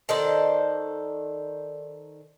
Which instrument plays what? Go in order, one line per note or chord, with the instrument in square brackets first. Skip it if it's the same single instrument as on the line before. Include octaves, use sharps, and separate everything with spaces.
[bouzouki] D#3 A4 C5 D5